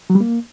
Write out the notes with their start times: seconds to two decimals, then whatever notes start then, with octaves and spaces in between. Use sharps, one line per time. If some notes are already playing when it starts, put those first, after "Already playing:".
0.10 F#3
0.15 G3
0.20 A#3